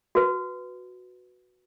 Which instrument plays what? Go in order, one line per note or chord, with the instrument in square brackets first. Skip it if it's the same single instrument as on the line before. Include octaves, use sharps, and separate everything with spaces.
[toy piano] F#4 B4